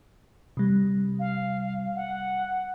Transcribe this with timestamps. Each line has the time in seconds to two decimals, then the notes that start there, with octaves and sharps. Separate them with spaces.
0.57 C3 G3
1.19 F5
1.96 F#5